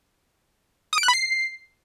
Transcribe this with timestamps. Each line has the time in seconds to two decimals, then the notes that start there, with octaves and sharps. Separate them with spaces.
0.93 D#6
0.98 D7
1.03 F#6
1.08 B5
1.14 C7